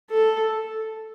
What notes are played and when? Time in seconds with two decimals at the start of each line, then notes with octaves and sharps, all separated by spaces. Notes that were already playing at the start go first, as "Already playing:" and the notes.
0.11 A4